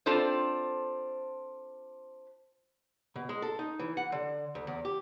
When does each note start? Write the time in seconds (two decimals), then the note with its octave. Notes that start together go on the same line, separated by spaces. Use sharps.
0.06 C4 D4 F4 A4 C5
3.16 B2
3.29 G#3
3.42 A4
3.59 D#4
3.79 E3
3.97 F#5
4.12 D3
4.55 D2
4.67 E2
4.85 G4